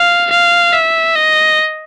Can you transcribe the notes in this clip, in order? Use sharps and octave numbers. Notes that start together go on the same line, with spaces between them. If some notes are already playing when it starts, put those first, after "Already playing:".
Already playing: F5
F5
E5
D#5